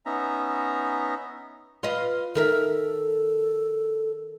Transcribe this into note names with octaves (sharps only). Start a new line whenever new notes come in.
B3 C#4 D#4 E5 A#5
F4 B4 D#5
D#3 A4 A#4 E5